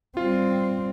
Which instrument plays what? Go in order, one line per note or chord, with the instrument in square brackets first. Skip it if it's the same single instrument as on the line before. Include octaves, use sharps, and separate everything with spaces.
[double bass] G3 C4 [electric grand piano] F4